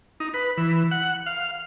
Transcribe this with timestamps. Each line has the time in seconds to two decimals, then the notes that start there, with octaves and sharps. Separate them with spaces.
0.20 D#4
0.34 B4
0.58 E3
0.91 F#5
1.26 F5